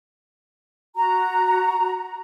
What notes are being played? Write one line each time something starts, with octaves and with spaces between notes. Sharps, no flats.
F#4 A#5